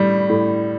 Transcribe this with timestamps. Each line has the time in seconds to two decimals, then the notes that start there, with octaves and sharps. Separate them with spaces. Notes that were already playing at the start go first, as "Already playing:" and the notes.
Already playing: A2 G3
0.30 A2